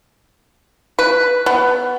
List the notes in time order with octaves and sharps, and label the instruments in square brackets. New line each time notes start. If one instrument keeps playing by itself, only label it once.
[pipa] B4
B3